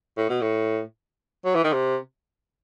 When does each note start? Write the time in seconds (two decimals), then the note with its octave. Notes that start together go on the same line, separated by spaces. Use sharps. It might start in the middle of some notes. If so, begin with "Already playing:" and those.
0.17 A2
0.30 B2
0.42 A2
1.45 F#3
1.55 E3
1.64 D#3
1.73 C3